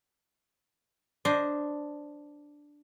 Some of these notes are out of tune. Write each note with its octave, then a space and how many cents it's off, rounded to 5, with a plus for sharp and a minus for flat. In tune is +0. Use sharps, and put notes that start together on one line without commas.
D4 +0 C5 +0 D#5 +0